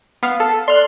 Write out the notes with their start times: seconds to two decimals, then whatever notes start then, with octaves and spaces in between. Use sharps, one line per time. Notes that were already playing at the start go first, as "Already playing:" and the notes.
0.23 B3 F5 C#7
0.40 A4
0.68 D5 C6 F6 F#6